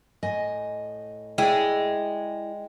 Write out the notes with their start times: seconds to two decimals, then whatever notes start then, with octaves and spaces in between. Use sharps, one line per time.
0.23 A2 D#5 G#5
1.38 G#3 E4 D5 G5